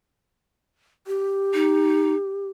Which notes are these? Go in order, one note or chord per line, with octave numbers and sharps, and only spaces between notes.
G4
D#4